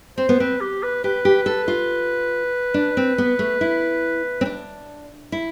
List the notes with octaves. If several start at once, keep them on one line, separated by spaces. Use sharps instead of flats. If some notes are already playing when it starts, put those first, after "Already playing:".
C4 C5
B3
C4 B4
G4
B4
G4 B4
G4
A4
F4
D4
C4
B3
A3
E4
C4
D4
E4